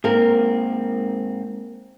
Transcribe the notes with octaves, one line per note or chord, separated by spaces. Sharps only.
G#2 A#3 C4 A#4